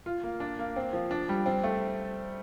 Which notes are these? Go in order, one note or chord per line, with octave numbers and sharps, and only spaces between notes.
F4
A#3
D4
A#3
C4
F3
D4
G3
C4
A3